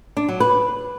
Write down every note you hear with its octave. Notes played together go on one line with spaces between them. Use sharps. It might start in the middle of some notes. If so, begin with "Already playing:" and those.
D4
F#3
B4